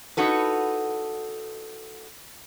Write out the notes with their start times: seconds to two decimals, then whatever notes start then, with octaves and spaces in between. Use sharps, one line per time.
0.17 D#4 E4 F#4 A4 B4